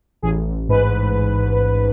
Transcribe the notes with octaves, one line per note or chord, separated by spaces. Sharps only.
A1 G#4
A1
G#2 B4